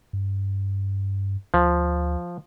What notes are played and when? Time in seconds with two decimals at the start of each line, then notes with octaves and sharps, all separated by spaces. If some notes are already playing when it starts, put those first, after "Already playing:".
0.13 G2
1.54 D2 F3